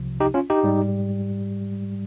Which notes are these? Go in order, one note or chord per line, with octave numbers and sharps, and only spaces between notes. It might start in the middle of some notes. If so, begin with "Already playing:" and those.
Already playing: C2 C3 F3
D#4 G4
C#4 F4
D#4 G4
G#2 G3